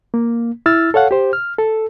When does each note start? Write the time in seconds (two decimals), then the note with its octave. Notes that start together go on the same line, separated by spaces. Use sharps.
0.14 A#3
0.66 E4 E6 F6 A6
0.94 A4 C#5 F5 F#5
1.11 G4 C5
1.33 F6
1.58 A4